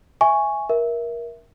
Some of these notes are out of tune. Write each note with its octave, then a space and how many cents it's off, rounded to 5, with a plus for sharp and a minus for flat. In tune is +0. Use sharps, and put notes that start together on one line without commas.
E5 +0 G#5 +0 C#6 +0
A#4 +20 E5 +0